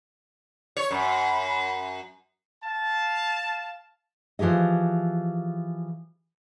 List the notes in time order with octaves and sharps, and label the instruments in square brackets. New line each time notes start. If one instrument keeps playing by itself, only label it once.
[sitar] C#5
[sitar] F#2 [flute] B5
[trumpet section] F5 A5
[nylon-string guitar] E3 F3 G4 G#4 D#5